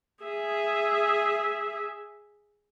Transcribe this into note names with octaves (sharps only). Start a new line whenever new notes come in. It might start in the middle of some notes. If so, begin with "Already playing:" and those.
G#4 E5